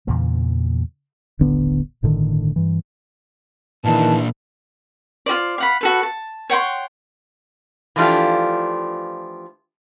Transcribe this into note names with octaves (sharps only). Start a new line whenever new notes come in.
E2 A#2 C#3 E3
D#1 A1 D3 B3
G1 A2 D3 D#3
G2 E3
A#2 D#3 E3 D4 A5
F4 F#4 C5 D5
F5 F#5 B5
F#4 A4 B4
A5
C#5 F#5 G5 C6
E3 F3 A3 D4 F4 G4